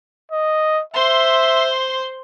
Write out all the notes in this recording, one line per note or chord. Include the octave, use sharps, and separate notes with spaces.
D#5
C5 E5 C6